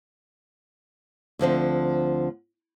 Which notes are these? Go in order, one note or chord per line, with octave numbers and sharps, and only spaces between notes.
D2 D3 F3 C4